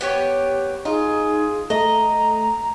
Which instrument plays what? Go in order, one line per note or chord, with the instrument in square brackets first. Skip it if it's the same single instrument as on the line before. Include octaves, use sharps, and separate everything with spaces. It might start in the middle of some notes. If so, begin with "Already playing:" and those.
[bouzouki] B3 G4 C#5
[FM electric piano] D#4 [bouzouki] F4 [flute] G#4
[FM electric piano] A3 [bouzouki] D#5 [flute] A#5